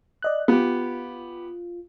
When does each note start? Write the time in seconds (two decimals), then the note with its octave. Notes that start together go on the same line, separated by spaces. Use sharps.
0.22 D5 D#5 F#6
0.48 B3 F4 G4